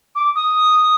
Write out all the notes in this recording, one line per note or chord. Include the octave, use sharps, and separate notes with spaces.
D6
D#6